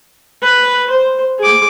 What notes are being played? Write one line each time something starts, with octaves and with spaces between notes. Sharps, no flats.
B4
C5
G#4 D6